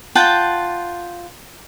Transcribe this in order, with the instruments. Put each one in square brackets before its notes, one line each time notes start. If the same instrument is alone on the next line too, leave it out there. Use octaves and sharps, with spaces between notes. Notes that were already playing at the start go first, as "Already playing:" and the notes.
[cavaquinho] F4 F#5 G5 A5